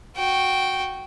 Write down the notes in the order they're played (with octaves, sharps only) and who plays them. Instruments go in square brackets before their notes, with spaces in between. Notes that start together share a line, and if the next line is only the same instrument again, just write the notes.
[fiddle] F#4 G5